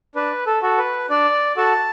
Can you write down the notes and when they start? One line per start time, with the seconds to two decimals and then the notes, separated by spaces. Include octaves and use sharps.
0.15 D4 B4
0.47 A4
0.63 F#4 A4
0.78 B4
1.10 D4 D5
1.57 F#4 A4 A5